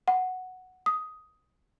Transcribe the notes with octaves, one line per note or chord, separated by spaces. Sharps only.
F#5
D#6